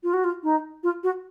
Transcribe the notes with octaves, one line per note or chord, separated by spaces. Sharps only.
F4
F#4
F4
D#4
F4
F#4